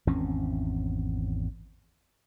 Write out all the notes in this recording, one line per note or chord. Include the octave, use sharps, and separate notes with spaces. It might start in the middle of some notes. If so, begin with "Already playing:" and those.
G#1 E2 C4 C#4